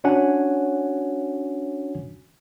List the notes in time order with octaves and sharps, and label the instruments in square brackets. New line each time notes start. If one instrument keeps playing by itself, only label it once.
[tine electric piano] C#4 D4 F#4 C#5 F#5 G#5